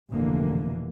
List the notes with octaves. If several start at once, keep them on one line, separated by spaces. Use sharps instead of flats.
F1 D2 B2 D3 E3 A#3